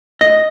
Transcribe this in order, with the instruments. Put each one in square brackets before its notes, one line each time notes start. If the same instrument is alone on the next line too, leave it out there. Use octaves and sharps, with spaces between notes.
[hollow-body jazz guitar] D#5